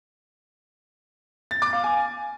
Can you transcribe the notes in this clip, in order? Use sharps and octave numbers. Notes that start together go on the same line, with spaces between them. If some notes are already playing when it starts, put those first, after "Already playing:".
A6
D6
F5
G#5